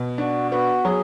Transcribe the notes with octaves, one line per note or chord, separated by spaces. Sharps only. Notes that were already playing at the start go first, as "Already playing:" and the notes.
Already playing: B2
D4 F#4
B3 F#4
F#3 G#4